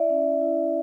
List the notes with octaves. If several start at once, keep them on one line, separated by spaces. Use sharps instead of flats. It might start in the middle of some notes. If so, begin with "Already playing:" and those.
Already playing: E4 D5 E5
C#4
E4